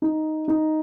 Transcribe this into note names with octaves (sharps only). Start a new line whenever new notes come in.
D#4
D#4